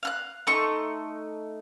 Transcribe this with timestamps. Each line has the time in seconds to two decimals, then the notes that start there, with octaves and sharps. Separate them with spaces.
0.03 F5 F6 F#6
0.47 A3 D#4 C6 C#6